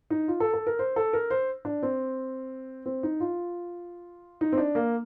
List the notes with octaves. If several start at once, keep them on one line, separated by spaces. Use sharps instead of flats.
D#4
F4
A4
A4
A#4
C5
A4
A#4
C5
D4
C4
C4
D#4
F4
D#4
C4
D4
A#3